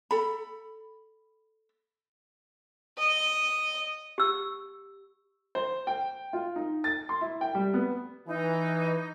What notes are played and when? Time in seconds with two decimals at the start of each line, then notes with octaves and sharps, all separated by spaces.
0.11 A4 B5
2.98 D#5
4.18 G4 E6
5.55 C5
5.87 G5
6.33 F4
6.56 D#4
6.84 A6
7.09 C6
7.21 E4
7.41 G5
7.55 G3
7.74 B3
8.27 E3 D#4